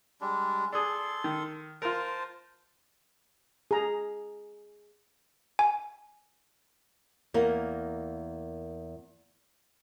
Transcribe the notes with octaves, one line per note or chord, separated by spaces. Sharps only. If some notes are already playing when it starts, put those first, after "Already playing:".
G3 G#3 D4
D4 G#4 A4 C6
D#3
F4 A#4 C5 A5
G#4 A#5
G#5
E2 A#3 A#4